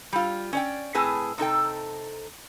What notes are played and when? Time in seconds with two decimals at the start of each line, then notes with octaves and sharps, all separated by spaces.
0.13 G3 F4
0.53 C#4 D5 G5
0.95 A2 C4 G#4 B4 A5
1.38 C3 D#4 A4 G5